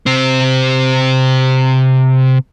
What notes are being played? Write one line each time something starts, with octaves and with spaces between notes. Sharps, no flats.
C3 C4